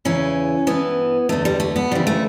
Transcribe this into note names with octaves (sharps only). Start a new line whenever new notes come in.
E2 C#3 E3 C#4
G2 E3 B3
E2 D3 A3
G3
A3
B3
D2 C#3 E3 G3
A3